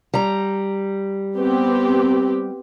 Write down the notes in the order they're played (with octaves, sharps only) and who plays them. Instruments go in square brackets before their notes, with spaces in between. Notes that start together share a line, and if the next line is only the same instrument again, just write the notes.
[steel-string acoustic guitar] G3 A#5
[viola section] B3 C4 G4